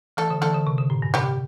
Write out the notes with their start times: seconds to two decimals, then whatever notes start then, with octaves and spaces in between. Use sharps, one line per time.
0.17 E3 A3 A4
0.30 D3
0.42 E3 A3 A4
0.55 D3
0.67 C3
0.78 D3
0.90 A2
1.02 G2
1.14 C3 G3 G4